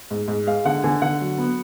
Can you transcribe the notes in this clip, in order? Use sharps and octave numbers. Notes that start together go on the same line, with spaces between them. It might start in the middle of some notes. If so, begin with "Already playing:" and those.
G#2
G#2
G#3 F5
D3 F#5
D3 G#5
D3 F#5
F#3
B3